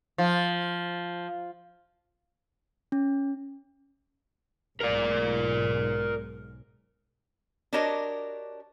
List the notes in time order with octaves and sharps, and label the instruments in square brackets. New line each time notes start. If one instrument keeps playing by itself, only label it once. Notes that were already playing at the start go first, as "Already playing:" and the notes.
[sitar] F3
[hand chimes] C#4
[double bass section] B1 G#2 [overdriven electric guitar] A#4 D5
[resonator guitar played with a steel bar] D4 F#4 G4 A#4 C#5 D#5